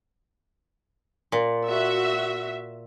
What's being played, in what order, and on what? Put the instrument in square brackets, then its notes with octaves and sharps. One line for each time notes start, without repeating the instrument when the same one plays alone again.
[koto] A#2
[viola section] F#4 E5